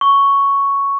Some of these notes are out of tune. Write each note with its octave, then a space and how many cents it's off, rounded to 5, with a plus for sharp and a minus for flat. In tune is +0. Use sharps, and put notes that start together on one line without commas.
C#6 +5